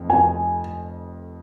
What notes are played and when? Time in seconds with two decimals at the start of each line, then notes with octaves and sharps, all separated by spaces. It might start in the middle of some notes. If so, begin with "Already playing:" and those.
Already playing: F1 F2
0.10 G#5